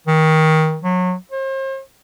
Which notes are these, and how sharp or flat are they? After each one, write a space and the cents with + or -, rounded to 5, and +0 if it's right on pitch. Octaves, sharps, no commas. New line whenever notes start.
D#3 +20
F#3 -25
C5 +40